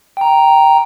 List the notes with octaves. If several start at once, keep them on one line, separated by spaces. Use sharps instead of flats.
G5 A#5